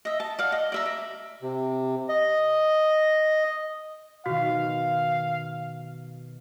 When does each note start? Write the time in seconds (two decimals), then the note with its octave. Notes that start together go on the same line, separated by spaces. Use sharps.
0.05 D#5 E5
0.20 A5
0.39 D5 F5 F#5
0.52 D#5
0.72 D5 E5 A#5
0.86 E5
1.42 C3
2.09 D#5
4.26 B2 D#3 F#4 F5